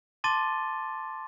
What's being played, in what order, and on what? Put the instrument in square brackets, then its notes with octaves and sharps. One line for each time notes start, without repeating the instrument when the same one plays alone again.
[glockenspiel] A5 C6 D6 A6 D#7 G7